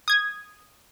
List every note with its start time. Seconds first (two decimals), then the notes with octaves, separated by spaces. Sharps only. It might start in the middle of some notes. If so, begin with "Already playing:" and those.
0.08 D#6 G#6